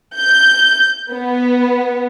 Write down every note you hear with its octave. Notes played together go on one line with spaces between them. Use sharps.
G6
B3